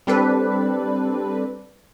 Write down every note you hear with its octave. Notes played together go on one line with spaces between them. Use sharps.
G3 C4 D4 A4 B4